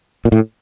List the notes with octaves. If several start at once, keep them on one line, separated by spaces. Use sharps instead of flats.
A#2
A2